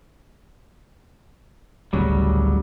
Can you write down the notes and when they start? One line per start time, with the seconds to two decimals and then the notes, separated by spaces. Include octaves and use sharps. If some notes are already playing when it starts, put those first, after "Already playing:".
1.93 A1 D2 C#3 F#3 G3